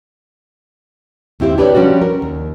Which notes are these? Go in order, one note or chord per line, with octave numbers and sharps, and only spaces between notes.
D#2 C4 E4 G4 C5
D4 G4 B4 C#5 D5
F3 G3 C#4 D4 F#4
A#4
D#2